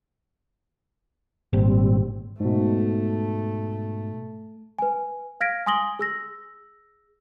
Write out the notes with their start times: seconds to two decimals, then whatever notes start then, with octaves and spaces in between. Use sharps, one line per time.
1.53 G#1 A#2 G3 C4
2.40 G#2 B2 A3
4.79 B4 G#5
5.40 F5 F6 G#6 A#6 B6 D7
5.66 G#5 C6 D#6 A#6 F#7 G7
5.99 G#4 E6 A#6